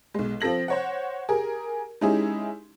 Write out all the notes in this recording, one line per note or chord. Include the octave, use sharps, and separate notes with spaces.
B1 G#3
F3 C4 A4 A#6 F#7
C5 C#5 F#5
G4 G#4 A#4
G#3 C#4 D#4 E4 G4 G#4